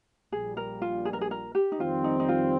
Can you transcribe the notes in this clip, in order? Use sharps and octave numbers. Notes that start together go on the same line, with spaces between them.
A#1 A#2 G3 G#4
A#4
F4
G#4
A#4
G#4
A#4
G4
D#4
F2 D#3 G3 C4 F4
D#4
D#4
F4